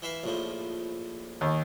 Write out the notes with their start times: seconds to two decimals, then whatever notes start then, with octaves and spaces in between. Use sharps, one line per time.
0.02 E3 E5 F5
0.24 A#1 A2 F3
1.41 D#2